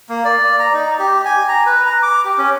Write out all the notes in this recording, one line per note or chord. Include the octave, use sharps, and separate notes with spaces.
A#3
D5
A#5
D#4
G4
G#5
A#5
B4
A#5
D6
G4
C#4